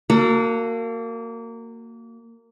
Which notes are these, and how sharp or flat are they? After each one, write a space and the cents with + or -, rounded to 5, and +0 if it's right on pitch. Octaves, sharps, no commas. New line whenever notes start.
A#3 -20 F#4 +0 A4 +25